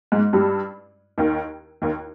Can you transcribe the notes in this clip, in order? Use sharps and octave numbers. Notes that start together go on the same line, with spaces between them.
G#2 G#3
G2 G3
D#2 D#3
D#2 D#3